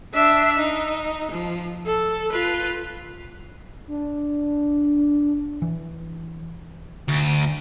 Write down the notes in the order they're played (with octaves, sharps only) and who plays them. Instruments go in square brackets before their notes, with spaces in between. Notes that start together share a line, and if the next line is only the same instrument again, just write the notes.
[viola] D4 E5
D#4
F3
A4
F4 B4
[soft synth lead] D4
[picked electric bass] E3
[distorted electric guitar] D2